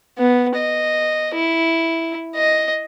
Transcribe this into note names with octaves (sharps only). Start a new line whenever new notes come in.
B3
D#5
E4
D#5